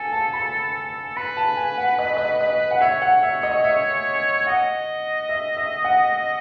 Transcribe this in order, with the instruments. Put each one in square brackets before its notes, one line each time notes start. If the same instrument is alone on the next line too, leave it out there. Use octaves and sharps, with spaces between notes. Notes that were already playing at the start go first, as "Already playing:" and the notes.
Already playing: [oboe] A4 [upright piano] G#5
[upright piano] A5
B5
[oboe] B4 [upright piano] B5
[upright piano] A5
G#5
F#5
D#5
D#5
D#5
F#5
[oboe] C#5 [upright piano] E5
[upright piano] F#5
E5
D#5
E5
[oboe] D#5 [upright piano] F#5
[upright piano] E5
E5
F#5